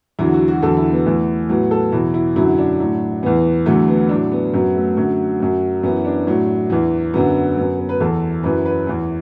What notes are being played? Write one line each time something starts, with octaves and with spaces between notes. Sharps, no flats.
E2 D3 F#3 E4
F#4
F#4
E2 D3 F#3 A4
E4
B3
E2 E3 A3
A2 F#3 B3
A4
E2 B2 F#3 E4
E4
F#2 D3 F#3 E4
D4
A2 F#3
E2 E3 B3
E2 D3 F#3 A3
B3
A2 F#3 D4
B3
F#2 F#3 B3
A3
F#2 D3 F#3
F#2 F#3
F#2 E3 B3
D4
A2 F#3
E2 E3
F#2 D3 F#3 B3
F#2 F#3 B3
B3
B4
E2 E3 A4
F#2 E3 B4
B4
E2 E3